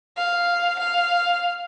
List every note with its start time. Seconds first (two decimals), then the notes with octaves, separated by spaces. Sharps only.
0.17 F5
0.79 F5